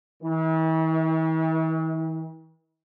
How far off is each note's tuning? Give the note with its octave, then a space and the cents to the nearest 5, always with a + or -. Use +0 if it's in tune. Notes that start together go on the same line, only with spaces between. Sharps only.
E3 -45